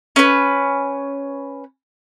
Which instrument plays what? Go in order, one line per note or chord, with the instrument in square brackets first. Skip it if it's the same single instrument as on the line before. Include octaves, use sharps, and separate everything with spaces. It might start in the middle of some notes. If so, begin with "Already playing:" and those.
[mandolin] C#4 B4